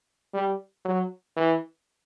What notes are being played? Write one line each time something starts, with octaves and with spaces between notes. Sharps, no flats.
G3
F#3
E3